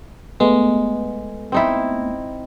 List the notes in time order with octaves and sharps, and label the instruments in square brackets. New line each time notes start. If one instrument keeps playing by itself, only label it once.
[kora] G#3 [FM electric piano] A3 B3
[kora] C4 D#4 E4